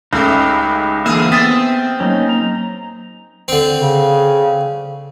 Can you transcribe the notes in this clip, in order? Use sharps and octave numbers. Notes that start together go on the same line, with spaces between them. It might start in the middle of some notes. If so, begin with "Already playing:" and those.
C#2 C#3 A3 D#4 G4
E2 D3 A#3 G#4 E5 F5
B3 C4 D#6 A6 B6
F#3 A#3 C#4 D#4
A#5
D3 C4
C#3